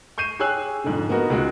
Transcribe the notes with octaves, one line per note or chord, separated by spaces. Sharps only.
C#6 G6 C7 D#7 E7
G4 G#4 C#5 G#5 E6 F#6
F2 G#2 D3
A#3 B3 D#4 F#4 A#4
C#2 G#3 F#4